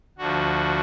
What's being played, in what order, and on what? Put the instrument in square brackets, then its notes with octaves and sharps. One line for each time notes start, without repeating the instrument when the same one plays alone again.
[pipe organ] D2 D3 F3 F#4